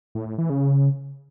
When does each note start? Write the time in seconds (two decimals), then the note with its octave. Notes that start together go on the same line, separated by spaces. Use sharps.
0.15 A2
0.27 A2
0.38 E3
0.50 C#3